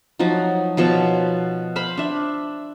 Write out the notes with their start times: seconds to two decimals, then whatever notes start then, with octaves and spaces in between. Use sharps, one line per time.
0.19 F3 F#3 D#4 F#4
0.77 B2 F3 C#5 A5
1.76 C5 F5 B5
1.97 D4 E5